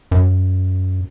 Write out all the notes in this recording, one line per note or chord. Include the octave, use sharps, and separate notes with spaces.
F#2